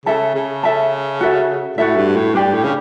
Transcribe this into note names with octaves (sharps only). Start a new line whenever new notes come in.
C#3 A4 E5 A5
C#3
A4 E5 A5
F#4 A4 E5
A2 F#4 A4 E5
G2
A2
G2 D4 G4 D5
A2
C#3